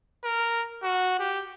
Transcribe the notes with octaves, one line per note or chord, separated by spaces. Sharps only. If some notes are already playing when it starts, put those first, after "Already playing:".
A#4
F#4
G4